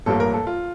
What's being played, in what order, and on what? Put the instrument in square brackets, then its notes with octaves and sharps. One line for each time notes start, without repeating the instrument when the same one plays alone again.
[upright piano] A1 G2 F3 A#3 A4
A#4
A4
F4